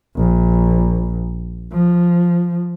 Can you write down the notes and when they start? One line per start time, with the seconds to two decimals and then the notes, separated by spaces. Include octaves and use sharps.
0.17 A#1
1.72 F3